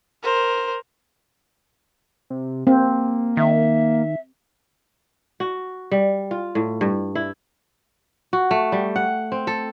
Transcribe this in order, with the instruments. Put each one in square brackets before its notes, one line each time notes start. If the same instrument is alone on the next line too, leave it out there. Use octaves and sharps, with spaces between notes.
[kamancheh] A#4 C5
[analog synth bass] C3
[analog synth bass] A#3 [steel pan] C4
[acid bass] D#3 [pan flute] E5
[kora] F#4
G3
F4
A2
G2
E4
F#4
A3
G3
F#5
C4
A4